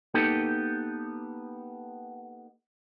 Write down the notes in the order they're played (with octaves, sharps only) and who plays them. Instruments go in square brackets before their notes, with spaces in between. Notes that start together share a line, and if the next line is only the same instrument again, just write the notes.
[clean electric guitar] A#3 B3 D#4 G4 A4